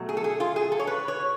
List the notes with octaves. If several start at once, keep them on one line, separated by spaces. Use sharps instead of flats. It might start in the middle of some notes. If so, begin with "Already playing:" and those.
Already playing: B2 F#3 A3
G#4
A4
G#4
F4
G#4
A4
C#5
B4
C#5